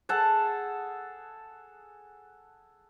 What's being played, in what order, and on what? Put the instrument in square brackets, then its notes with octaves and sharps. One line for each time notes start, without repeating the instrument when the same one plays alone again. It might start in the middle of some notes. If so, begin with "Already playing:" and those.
[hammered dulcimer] G#4 A4 F#5 A5